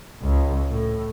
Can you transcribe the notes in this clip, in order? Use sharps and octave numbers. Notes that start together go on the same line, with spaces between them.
C#2
A2